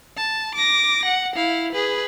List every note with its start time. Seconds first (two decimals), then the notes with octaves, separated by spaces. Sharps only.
0.17 A5
0.55 D6 A#6
1.05 F#5
1.36 E4 F5
1.72 G#4 B4